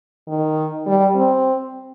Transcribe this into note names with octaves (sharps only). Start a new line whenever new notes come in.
D#3
G3
C4